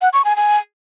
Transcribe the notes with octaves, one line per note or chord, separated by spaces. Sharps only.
F#5
C#6
G#5
G#5